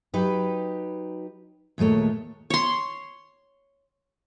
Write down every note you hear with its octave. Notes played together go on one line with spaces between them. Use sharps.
F#3 D#4 G4 B4
D#2 A#2 G#3 A3 C#5
C#5 C6